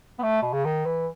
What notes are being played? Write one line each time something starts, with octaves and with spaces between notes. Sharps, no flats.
B3
A3
B2
C#3
D#3
E3